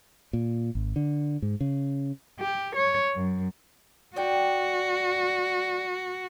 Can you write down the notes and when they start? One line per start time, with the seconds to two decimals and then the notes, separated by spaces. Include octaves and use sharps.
0.33 A#2
0.75 G#1
0.96 D3
1.42 G#2
1.61 C#3
2.40 G4
2.76 C#5
3.15 F#2
4.16 D4 F#4 D5 G5